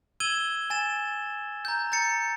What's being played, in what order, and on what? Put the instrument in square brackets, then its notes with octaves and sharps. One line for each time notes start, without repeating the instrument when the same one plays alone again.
[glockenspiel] E6 G#6 D#7 E7 F#7 G7
G#5 A6 E7
A#5 G6
A#5 G6 A6 C#7